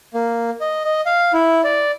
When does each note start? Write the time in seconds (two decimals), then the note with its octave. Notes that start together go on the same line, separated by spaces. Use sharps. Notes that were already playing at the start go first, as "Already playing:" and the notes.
0.14 A#3
0.61 D#5
0.84 D#5
1.06 F5
1.33 E4
1.64 D5